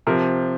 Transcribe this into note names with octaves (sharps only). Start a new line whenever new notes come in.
C3 F3 A#4